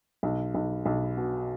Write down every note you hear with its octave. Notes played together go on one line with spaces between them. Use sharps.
B1
B1
B1
B2